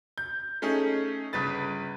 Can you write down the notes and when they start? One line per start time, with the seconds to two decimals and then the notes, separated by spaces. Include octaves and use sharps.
0.18 G6
0.62 A3 C#4 D#4 G#4
1.33 G1 C#3 B4 A6